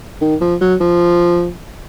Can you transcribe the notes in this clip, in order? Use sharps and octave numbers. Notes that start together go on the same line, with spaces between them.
D#3
F3
F#3
F3